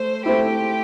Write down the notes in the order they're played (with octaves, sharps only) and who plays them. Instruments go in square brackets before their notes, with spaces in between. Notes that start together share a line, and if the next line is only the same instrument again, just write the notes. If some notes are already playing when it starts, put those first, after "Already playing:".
Already playing: [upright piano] A3 [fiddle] C5
[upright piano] A3 C4 E4 [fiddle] G4